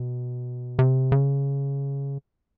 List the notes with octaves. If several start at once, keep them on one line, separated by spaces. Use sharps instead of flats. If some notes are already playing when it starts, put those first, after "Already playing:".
Already playing: B2
C3
C#3